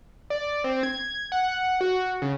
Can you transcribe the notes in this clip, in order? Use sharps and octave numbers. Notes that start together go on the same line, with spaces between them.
D5
C4
G#6
F#5
F#5
F#4
C#3